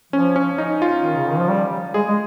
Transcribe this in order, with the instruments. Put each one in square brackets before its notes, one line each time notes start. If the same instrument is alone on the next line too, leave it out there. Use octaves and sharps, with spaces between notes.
[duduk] F3 [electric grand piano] C#4
[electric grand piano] C#4
D#4
F4
[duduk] D#3
C#3
D#3
F3
G3
[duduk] G#3 [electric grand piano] G#4
[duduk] G#3